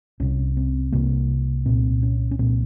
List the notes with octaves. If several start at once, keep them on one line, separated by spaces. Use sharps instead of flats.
C2 C3 C#4
C4
C2 C3 A#3
C2 A#2 C4
C#4
C#4
C2 A#2 C4